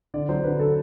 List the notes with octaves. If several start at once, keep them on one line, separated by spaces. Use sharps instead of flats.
D3 D5
F#3 C5
D3 B4
D3 A4